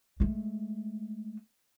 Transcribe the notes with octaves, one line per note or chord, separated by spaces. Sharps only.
G#3 A3